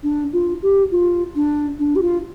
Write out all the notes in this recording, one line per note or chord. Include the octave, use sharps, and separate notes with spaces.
D4
F4
G4
F4
D4
D4
G4
F4